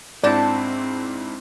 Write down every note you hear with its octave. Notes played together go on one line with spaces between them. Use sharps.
G#2 C4 D4 E4 F#4 D5 A5 G6